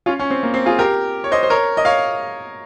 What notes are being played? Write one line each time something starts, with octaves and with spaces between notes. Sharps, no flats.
C#4 F4
C#4
C4
A#3
C4
F4 G#4
G4 A#4
C#5
C5 D#5
C5
A#4 C#5
D#5
C#5 F5